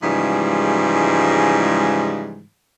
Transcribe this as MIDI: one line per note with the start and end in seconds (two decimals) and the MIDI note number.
0.02 2.44 44
0.02 2.44 49
0.02 2.44 52
0.02 2.44 53
0.02 2.44 55
0.02 2.44 56